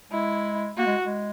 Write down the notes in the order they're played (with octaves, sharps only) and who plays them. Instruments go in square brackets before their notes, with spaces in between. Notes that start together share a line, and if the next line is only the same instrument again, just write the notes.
[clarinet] G#3 [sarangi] E4
[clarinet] A#3 [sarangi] F#4
[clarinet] G#3
G#3